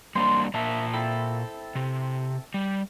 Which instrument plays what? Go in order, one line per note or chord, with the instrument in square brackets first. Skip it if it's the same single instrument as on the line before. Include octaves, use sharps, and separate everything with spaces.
[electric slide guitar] G3 A#3 D4 [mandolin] C5 C6
[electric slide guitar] A#2 A#3 A5 [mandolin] E5
[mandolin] C4 E4 A4
[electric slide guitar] C3
G3